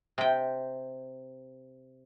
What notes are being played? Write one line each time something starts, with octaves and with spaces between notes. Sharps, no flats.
C3 G5